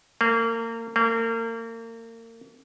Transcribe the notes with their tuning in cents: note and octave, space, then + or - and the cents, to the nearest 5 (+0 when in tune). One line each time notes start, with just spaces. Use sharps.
A#3 -30
A#3 -35